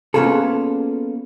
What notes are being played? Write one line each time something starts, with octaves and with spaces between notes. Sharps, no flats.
A#3 B3 C#4 F4 G#4 A4